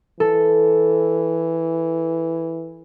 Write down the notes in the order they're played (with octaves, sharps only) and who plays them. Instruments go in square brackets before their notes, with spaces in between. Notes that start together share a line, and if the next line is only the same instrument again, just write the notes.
[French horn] E3 [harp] A4